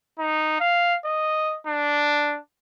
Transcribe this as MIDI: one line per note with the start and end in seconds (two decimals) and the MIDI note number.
0.19 0.59 63
0.60 0.96 77
1.05 1.57 75
1.67 2.38 62